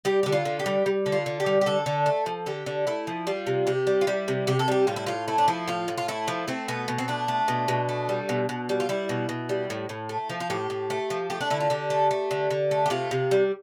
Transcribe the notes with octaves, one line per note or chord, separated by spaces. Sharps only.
G3 G4
D3 G4
F4
D3
G4
G3
G3
D3
F4
D3
G4
G3
G4
D3 A4
D3
A3
F3
D3 G4
D3
A3 E4
F3
G3 F4
C3
C3 G4
G3
F4
G3 E4
C3
C3 G4
A4
G3 G4
A2 F4
E4
A2 F4
A3 E4
D4
F3 E4
A2 F4
A2
F4
A3 E4
F3
A3 C4
B2 B3
B2
C4
A3 D4
A3
B2
B2
A3
G3
B2
B2
G3
F4
G3 E4
B2
B2
G3
A2
A2
A3
F3
F4
A2 G4
A2
A3
F3
A3 G4
D4
D3 E4
F4
D3 G4
A3
A3
D3
D3
A3
G4
C3 F4
C3
G3